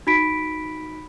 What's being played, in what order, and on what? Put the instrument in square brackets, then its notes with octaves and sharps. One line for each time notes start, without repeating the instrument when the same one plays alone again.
[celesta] D#4 F#4 B5 B6 D7